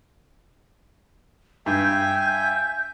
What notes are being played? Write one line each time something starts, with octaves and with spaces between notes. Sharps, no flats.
G2 E5 G5 G#5 G6